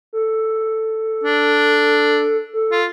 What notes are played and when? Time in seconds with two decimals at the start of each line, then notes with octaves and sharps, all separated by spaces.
0.13 A4
1.24 D4
2.54 A4
2.71 F4